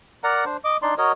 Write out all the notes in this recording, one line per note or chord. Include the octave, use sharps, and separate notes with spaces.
A#4 D5 F#5 A#5
D4 C5
D#5 D6
D4 D#4 D5 C6
F#4 A#4 C#5 D#5